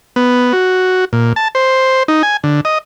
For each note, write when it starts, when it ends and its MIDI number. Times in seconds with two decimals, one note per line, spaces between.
0.16 0.53 59
0.53 1.05 66
1.13 1.33 46
1.36 1.48 81
1.55 2.03 72
2.08 2.23 63
2.23 2.37 80
2.44 2.61 50
2.65 2.78 75